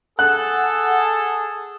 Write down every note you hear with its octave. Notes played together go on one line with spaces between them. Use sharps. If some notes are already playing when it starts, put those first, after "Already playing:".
G#4 A4 F#5 F#6